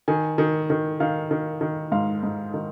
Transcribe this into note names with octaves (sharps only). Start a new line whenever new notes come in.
D#3 G#5
D#3
D#3
D#3 F5
D#3
D#3
G#2 F5
G#2
D#3